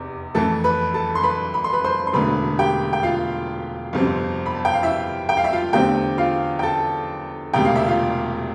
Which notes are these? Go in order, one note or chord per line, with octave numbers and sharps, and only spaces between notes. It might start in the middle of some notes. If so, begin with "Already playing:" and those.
Already playing: F1 E2 C3
F2 E3 A3 A4 A5
B4 B5
A4 A5
C6
B4 B5
B5
C6
B4 B5
C5 C6
C6
E1 D2 D3 B4 B5
G4 G5
G5
F4 F5
G1 F2 C3 F3 C4
B5
A5
G5
F5
E4 E5
G5
F5
E5
F4 F5
E2 D3 A3 C4 G4 G5
F4 F5
G5
A4 A5
E1 D2 C3 G5
F5
E5
F4 F5